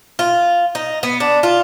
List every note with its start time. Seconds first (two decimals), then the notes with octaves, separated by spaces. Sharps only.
0.19 F4
0.75 D#4
1.03 B3
1.20 D4
1.43 F4